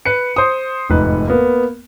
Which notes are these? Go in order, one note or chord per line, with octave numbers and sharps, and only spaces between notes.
B4 C#7
C5 D#6
F1 G#2 B4
A#3 B3